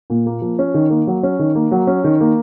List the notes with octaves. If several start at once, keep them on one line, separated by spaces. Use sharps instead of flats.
A#2
A#3
F3
C#4
D#3
A#3
F#3
C#4
D#3
A#3
F#3
C#4
D#3
A#3